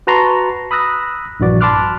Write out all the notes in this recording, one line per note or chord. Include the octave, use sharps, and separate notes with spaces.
F#4 B4 A5 A#5 C6 C#6
B5 D#6 E6 F#6 A#6
A#1 G2 E3 F#4 D5
A5 B5 C6 D6 F6 F#6